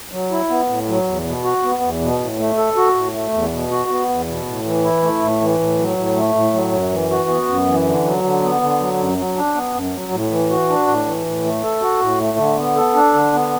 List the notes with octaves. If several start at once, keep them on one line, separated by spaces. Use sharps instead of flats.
F#3
E4
B3
A2
F#3
E2
B2
F#4
B3
E2
B2
A2
A3
A4
F#4
A2
A3
E2
B2
F#4
B3
E2
B2
A2
E3
E4
A3
A2
E3
A2
F#3
A2
A3
A2
F#3
F#2
E3
F#4
B3
F#2
E3
D3
F#3
D3
B3
D3
F#3
F#2
F#3
D4
B3
F#2
F#3
A2
E3
F#4
D4
A2
E3
A2
A3
A4
F#4
A2
A3
D3
B3
A4
D4
D3
B3